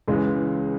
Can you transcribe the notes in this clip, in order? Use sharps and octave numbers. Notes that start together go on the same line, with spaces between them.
C#2 C#3 E3 G#3